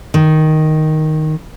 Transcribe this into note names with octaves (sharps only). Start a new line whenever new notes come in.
D#3